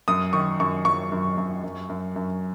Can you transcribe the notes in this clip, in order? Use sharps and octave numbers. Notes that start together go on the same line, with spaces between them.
F#2 D#6
D#3 C#6
F#2 C#6
F#2 C#6
F#2
F#2
F#2
F#2
F#2